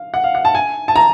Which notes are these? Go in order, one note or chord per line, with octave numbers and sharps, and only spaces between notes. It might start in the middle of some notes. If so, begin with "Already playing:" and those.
Already playing: F5
F#5
F5
F#5
A5
G#5
A5
A#5